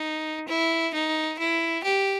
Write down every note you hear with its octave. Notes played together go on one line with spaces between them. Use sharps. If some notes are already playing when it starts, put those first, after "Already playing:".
Already playing: D#4
E4
D#4
E4
G4